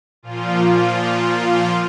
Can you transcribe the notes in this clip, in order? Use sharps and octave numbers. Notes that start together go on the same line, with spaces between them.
A#2 F3 F4